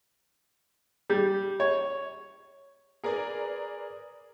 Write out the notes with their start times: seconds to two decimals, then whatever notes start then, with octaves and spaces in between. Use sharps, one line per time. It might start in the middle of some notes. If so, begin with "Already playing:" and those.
1.10 G3
1.60 C#5
3.04 G#4 A#4 B4 D5